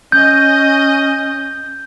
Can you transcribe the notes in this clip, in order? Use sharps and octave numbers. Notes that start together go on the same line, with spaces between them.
C#4 D#5 G6